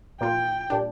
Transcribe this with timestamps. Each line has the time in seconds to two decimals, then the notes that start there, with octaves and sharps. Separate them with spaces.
0.21 A#2 A#3 F4 G5
0.70 A#2 G3 D4